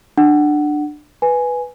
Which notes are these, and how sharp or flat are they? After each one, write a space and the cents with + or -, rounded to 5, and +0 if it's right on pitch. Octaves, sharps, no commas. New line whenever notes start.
D4 +20 F#5 +10
B4 +0 G#5 +5